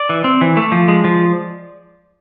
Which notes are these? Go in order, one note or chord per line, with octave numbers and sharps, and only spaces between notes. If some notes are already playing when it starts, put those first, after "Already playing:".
Already playing: D5
E3
C4
E3
A3
F3
G#3
F3